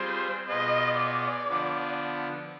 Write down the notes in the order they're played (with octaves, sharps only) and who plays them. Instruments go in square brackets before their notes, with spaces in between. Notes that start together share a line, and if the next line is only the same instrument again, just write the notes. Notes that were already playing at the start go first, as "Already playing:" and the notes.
Already playing: [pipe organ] G3 C4 F4 G#4 [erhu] C5
[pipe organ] B2 B3 F4 G#4 [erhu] D#5
[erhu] D5
[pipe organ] D3 F3 B3 D4